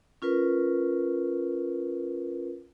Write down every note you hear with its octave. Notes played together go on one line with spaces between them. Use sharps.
C#4 F4 A#4 B4